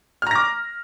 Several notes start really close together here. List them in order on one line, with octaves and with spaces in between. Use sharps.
F6 A#5 A#6 D6